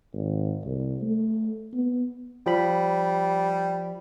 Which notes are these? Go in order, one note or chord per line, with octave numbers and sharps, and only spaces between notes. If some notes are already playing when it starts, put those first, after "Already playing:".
G#1
C2
A3
B3
F3 G3 B5